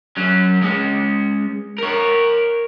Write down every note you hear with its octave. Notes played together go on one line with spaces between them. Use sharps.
F#3 C#4
G#3 C#4
A#4 C#5